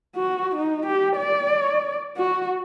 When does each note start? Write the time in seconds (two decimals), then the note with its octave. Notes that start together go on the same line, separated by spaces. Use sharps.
0.15 F#4
0.55 D#4
0.86 G4
1.16 D5
2.17 F#4